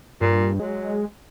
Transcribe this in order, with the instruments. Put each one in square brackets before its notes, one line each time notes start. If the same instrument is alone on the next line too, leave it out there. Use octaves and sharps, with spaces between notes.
[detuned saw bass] G2 [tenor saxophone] A#2
[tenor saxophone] F#3 [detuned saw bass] G#3